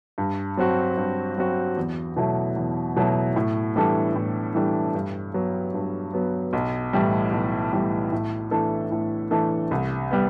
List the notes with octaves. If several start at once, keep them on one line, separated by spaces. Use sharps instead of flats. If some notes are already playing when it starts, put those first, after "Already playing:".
G2
F#3 C4 F#4
G2
F#3 C4 F#4
E2
B2 F#3 A3 E4
E2
B2 F#3 A3 E4
A2
E3 G3 D4 A4
A2
E3 G3 D4 A4
G2
F#3 B3
G2
F#3 B3
B1
A2 E3 G3
B1
A2 E3 G3
A2
E3 A3 D4 A4
A2
E3 A3 D4 A4
C2
G3 B3